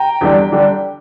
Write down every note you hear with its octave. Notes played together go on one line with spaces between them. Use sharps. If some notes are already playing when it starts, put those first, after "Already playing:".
Already playing: G5 A#5
E2 D3 G3 D4
D3 G3 D4